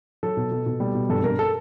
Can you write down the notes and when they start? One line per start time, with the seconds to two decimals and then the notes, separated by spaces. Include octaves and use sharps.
0.23 F#3 A4
0.37 B2
0.51 B2
0.66 B2
0.80 G3
0.95 B2
1.10 G2 A4
1.24 G2 A#4
1.39 A4